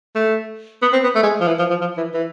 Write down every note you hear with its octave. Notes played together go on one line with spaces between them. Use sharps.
A3
B3
C4
B3
A3
G#3
F3
E3
F3
F3
F3
E3
E3